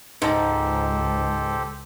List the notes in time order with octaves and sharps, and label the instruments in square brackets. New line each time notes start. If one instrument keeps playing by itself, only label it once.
[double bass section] C#2 [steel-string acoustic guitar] G#2 [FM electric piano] D#4 A5 [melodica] G4 A4 C5